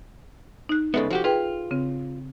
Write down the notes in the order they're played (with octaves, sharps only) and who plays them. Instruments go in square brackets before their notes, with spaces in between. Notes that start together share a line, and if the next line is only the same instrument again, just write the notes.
[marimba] D#4 F#6
[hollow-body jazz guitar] C#3 G#3 B3 [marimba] A4 E5
[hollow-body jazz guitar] F3 F#4 G4
[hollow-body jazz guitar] F4 [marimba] G#4 B4 G5
[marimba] C#3 C4